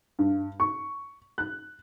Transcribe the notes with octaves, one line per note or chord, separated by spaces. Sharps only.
G2
C#6
F#6